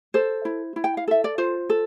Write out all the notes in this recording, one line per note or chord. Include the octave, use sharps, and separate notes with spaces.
A4 C5
E4
E4
G5
F5
A4 E5
D5
F4 C5
A4